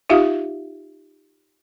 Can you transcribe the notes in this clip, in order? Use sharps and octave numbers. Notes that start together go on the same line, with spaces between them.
D#4 F4 G4 E5 F5